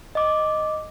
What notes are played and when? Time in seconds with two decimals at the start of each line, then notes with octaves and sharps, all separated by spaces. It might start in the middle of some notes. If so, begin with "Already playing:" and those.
0.15 D#5 D6